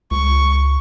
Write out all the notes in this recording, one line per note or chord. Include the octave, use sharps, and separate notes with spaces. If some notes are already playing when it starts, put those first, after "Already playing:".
C#2 C#6